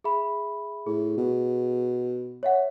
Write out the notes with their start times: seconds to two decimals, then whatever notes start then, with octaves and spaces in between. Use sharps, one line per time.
0.04 G#4 E5 B5
0.87 A2 G#4
1.17 B2
2.43 C#5 E5 F#5